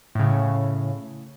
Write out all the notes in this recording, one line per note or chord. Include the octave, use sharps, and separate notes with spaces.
A2 C#3